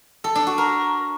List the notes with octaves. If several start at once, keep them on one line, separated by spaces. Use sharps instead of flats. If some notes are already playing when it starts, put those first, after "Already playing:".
A4
D4
F#4
A#4